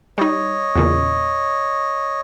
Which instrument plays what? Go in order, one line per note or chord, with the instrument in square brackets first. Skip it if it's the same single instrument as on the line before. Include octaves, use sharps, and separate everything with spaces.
[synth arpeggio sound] G3 D#4 [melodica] C#5 D#5
[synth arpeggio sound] E2 A#2 C#3